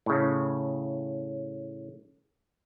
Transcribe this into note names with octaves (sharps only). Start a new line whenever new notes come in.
A2 C#3